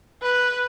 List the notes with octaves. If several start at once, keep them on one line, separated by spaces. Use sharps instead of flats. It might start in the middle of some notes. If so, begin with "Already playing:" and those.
B4